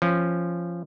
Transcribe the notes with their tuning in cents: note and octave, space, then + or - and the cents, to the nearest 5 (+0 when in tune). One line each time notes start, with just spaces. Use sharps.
F3 -15 C#4 -15